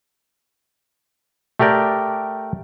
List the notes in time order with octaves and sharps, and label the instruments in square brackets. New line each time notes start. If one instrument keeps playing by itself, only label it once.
[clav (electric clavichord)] A3 G4 A#4 D5 G5